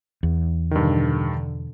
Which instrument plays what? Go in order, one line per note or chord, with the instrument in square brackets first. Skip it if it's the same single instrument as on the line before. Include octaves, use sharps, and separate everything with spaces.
[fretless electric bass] E2
[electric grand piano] G2 D#3 [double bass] B2 D3